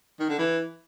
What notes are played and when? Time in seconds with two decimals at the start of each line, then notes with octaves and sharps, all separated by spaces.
0.20 D#3
0.29 D3
0.39 E3